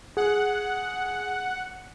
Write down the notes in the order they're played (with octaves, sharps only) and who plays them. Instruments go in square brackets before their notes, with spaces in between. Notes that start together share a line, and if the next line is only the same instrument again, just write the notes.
[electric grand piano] G#4 [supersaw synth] F#5